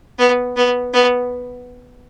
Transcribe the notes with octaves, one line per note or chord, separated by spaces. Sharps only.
B3
B3
B3